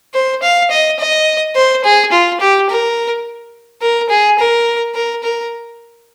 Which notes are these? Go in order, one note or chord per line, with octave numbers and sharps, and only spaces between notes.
C5
F5
D#5
D#5
C5
G#4
F4
G4
A#4
A#4
G#4
A#4
A#4
A#4